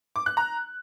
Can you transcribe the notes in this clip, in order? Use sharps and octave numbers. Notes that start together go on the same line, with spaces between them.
D6
F#6
A#5